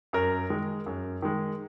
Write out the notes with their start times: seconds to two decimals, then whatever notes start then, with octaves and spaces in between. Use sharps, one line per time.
0.13 F#2 A#4
0.50 D#3 G#3
0.86 F#2
1.22 D#3 G#3